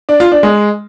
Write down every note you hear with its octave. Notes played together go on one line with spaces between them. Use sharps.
D4
F4
D4
G#3